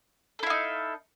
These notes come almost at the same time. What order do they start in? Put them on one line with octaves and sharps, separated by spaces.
A4 E4 F5 D#4